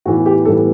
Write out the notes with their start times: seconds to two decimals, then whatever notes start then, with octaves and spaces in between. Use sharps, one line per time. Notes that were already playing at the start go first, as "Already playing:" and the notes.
0.06 A2 E3 B3 F#4
0.26 G4
0.45 A2 E3 G3 B3 A4